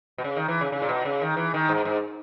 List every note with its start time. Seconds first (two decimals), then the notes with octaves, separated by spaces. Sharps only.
0.18 B2
0.24 C#3
0.37 D#3
0.48 E3
0.61 C#3
0.72 C#3
0.82 A#2
0.89 B2
1.05 C#3
1.22 D#3
1.37 E3
1.54 D#3
1.69 G#2
1.85 G#2